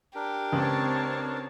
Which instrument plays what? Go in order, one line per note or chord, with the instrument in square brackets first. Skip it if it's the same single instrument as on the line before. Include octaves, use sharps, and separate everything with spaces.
[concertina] D4 A#4 [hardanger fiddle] G4
[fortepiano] C#2 [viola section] C4 C#5 A5